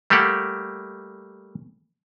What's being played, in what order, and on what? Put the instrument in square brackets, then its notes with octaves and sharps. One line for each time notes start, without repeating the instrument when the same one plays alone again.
[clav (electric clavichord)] G3 A3 A#3 G4 F#5